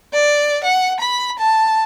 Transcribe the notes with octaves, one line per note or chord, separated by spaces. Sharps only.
D5
F#5
B5
A5